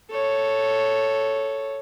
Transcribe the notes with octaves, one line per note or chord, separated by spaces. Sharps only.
A4 C#5